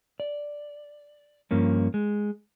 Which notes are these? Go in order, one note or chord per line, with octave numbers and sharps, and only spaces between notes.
D5
G2 F3 A#3 C#4
G#3